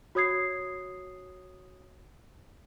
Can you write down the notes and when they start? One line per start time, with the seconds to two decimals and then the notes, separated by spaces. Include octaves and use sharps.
0.15 F#4 C#5 D#6 G#6 C7